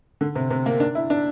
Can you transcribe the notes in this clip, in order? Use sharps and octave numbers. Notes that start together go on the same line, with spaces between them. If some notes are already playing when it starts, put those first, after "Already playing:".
D3
C3
C3
A#3
D4
E4
D4